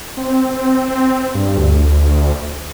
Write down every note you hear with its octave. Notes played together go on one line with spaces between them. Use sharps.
C4
G2
D2